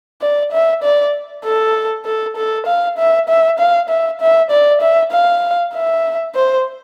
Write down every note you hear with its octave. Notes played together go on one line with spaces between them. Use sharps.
D5
E5
D5
A4
A4
A4
F5
E5
E5
F5
E5
E5
D5
E5
F5
E5
C5